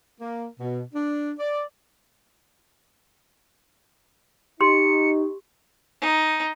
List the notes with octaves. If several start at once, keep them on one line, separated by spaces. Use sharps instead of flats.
A#3
B2
D4
D5
D#4 G4 C6 C#7
D#4